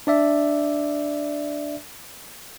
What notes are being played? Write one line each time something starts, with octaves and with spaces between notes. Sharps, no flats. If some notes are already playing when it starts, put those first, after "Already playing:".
D4 D5 E5